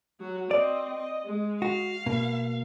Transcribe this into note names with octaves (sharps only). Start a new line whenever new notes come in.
F#3 F#4
C4 D5 D#5
D#5
G#3
F#4 F5
B2 A#3